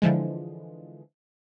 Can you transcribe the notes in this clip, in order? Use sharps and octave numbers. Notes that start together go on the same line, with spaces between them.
D3 E3 F3 G#3